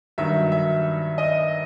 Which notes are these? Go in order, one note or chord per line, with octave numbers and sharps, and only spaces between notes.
G2 D#3 F#3 E5
E5
D#5